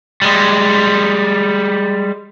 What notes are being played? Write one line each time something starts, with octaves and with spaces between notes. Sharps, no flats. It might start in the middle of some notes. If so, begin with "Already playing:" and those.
G3 G#3